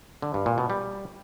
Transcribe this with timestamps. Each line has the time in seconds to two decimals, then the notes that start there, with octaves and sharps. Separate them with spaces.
0.22 D3
0.34 G2
0.46 A#2
0.58 B2
0.70 G3